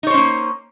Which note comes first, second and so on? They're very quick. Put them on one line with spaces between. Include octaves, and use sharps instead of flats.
D#4 C#5 C5 C#4 A#3